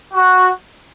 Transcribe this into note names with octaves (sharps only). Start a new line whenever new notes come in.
F#4